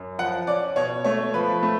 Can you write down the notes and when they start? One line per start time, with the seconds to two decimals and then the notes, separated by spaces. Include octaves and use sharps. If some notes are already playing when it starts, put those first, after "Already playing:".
Already playing: F#2
0.18 F3 F#5
0.47 C#4 D5
0.76 B2 C#5
1.04 A3 C#5
1.34 F3 B4
1.63 A3